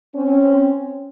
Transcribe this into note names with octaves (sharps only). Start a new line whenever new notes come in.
C4 C#4